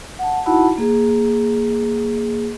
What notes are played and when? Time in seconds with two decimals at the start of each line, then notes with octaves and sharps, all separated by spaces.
0.19 F#5 A5
0.46 D#4 E4 F#4 F#5 A5 B5
0.78 A#3 G#4